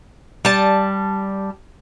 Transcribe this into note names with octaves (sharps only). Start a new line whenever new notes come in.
G3 A5